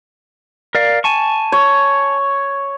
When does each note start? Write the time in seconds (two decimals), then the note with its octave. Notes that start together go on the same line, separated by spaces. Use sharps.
0.75 A#4 D5 F5
1.04 G#5 A5 C#6
1.52 C#5